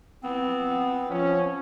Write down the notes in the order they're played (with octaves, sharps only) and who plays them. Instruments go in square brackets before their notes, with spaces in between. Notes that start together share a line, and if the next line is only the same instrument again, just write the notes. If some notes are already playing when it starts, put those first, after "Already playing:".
[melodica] B3 [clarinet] C4
[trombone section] F3 C#4